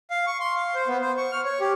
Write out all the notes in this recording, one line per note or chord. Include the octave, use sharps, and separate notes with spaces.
F5
C#6
C6
F5
C5
B3
C5
C#6
F6
C#5
G4